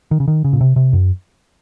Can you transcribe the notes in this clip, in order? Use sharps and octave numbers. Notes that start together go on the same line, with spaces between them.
D#3
C#3
D#3
C#3
A#2
C3
C3
F#2